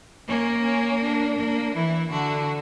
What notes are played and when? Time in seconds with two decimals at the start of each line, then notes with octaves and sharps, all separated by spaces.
0.27 A#3 C#4
0.64 C#4
1.02 D4
1.38 A#3
1.74 E3 E4
2.11 D3 F#4